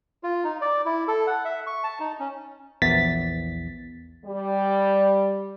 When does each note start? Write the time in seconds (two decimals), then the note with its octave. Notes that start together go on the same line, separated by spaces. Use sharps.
0.23 F4
0.44 D#4
0.61 D5
0.85 E4
1.08 A4
1.27 F#5
1.45 E5
1.67 C#6
1.84 A5
2.00 D#4
2.20 C#4
2.82 A#1 E2 A6 B6
4.25 G3